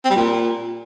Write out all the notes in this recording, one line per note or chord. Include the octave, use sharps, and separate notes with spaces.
C4
G3
A#2